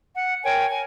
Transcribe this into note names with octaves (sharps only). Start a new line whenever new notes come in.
F#5
A#4 C#5 G5 G#5
G#5